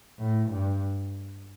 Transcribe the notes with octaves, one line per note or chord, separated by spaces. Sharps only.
A2
G2